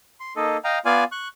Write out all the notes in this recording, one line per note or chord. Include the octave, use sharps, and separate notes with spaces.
C6
A#3 D#4 A4 D#5
D#5 F5 G5 A#5
B3 F4 D5 F5 G#5
C#6 F#6